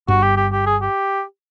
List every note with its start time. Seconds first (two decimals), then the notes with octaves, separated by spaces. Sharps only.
0.08 G1 G2 F#4
0.22 G4
0.37 G4
0.53 G4
0.67 G#4
0.82 G4